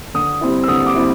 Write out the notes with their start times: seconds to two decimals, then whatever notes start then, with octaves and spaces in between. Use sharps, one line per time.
0.14 D3 D#6
0.41 G3 C4 E4
0.64 E6
0.68 D3 D#6
0.86 D6
0.95 G3 C4 E4